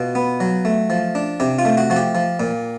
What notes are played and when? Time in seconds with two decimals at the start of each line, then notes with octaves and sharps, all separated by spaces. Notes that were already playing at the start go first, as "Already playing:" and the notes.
Already playing: B2 F4
0.15 B3
0.40 F#3
0.65 A3
0.90 F3
1.15 D4
1.40 C3 G4
1.59 F4
1.65 A3
1.77 F#4
1.90 F3 F#4
1.96 G4
2.15 F3
2.40 A#2